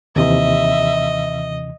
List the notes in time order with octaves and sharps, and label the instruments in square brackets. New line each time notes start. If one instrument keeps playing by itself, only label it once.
[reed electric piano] D#2 C3 E3 [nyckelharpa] D#5 [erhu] E5